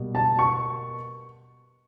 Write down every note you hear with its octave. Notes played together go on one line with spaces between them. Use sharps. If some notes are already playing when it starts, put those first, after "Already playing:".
Already playing: B2 G3 A#3
A5
C#6